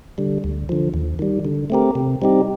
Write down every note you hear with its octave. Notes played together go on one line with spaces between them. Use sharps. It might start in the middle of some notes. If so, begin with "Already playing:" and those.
D3 G3
D2
D3 F3
D#2
D#3 G3
D3
A3 C4 G4 A#4
C3
G3 C4 D#4 G4